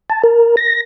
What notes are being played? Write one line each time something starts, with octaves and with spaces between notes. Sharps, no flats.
A5
A#4
A#6